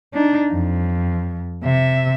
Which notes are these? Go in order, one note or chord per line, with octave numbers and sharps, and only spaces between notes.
D4 D#4
F2
C3 E5